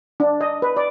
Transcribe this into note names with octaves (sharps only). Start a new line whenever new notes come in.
D4
D#5
B4
D5